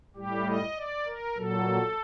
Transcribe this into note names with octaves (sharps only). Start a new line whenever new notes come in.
A2 G3 G4
D#5
D5
A#4
A#2 F#3 A4